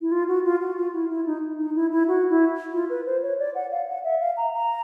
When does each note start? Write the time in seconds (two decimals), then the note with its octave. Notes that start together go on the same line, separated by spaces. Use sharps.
0.01 E4
0.12 F4
0.28 F#4
0.45 F4
0.61 F#4
0.77 F4
0.94 E4
1.10 E4
1.26 D#4
1.59 D#4
1.75 E4
1.92 E4
2.08 F#4
2.30 E4
2.73 F4
2.90 B4
3.06 C5
3.22 C#5
3.39 D5
3.55 F#5
3.71 F5
3.88 F#5
4.04 E5
4.20 F5
4.37 A#5
4.53 A#5